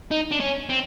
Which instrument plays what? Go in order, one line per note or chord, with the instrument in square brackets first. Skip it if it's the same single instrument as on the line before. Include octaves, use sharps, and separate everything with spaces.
[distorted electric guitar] D#4
D4
C#4
C4